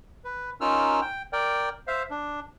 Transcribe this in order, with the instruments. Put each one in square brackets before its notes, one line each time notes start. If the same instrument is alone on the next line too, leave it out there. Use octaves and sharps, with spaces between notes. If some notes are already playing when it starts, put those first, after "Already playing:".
[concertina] B4
C#4 D#4 F4 A#4 E6 F6
G5
A#4 D5 G5
C5 E5 F5
D4